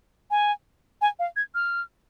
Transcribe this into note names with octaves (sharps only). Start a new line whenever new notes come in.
G#5
G#5
F5
G#6
F6